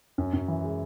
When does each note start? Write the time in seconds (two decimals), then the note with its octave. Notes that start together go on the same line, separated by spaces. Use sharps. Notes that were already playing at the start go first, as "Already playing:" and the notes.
0.18 F#2
0.34 F#2
0.48 E3
0.64 G#3